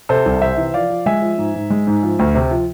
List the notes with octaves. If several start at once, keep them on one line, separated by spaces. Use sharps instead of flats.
C3 A4 C5
C2
C3 C5 E5
E3
F3 D5 F5
F3
G#3 E5 G#5
F3
G#2
G#2
G#3
G#2
F3
D2
C3
F3